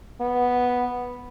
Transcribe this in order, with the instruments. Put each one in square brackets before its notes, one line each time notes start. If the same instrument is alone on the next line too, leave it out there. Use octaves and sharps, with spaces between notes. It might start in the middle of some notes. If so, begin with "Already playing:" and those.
[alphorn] B3